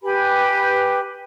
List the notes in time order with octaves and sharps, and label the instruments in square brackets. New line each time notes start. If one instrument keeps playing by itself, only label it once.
[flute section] G4 B4 G#5 B5